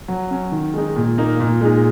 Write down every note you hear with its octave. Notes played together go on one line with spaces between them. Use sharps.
F#3
C#4
D#3
G#3 D#4
A#2
A#3 D#4
A#2
G#3 D#4